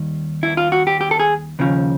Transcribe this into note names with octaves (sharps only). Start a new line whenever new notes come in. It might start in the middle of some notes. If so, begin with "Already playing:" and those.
Already playing: D#2 D#3 G3
E4
F4
F#4
G4
G4
A4
G#4
D#2 C#3 F3